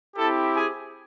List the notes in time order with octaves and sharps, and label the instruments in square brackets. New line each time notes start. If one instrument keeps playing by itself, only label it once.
[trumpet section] C4 E4 G4 A4 A5
G#4 G#5